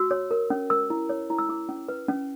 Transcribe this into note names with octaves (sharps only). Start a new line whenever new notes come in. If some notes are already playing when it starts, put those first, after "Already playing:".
Already playing: F#4 E6
C#5
A#4
C#4
A#4 E6
E4
C#5
E4
E6
E4 D6
C#4
B4
C#4